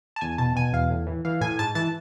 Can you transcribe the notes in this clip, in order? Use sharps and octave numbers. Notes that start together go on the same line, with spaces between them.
A5
E2 G#5
B2 A5
B2 G#5
E2 F5
A2
E3
E3 F5
A2 G#5
G#2 A5
E3 A5